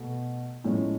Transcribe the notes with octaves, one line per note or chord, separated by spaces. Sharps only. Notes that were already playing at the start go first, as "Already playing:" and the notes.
Already playing: B2 A3
A2 F3 G#3 C#4